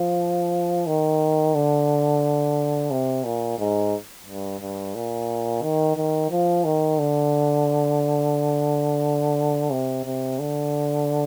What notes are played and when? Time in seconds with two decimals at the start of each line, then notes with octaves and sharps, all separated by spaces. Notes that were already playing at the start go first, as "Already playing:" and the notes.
Already playing: F3
0.87 D#3
1.54 D3
2.91 C3
3.25 A#2
3.59 G#2
4.27 G2
4.61 G2
4.95 A#2
5.63 D#3
5.97 D#3
6.31 F3
6.65 D#3
6.99 D3
9.71 C3
10.05 C3
10.39 D3